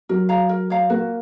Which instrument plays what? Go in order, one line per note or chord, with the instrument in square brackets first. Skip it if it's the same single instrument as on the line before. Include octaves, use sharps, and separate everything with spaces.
[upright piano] F#3 [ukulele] A#4
[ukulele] C#5 F5 A#5
A#4
C#5 F5 A#5
[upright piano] A#3 [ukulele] F#4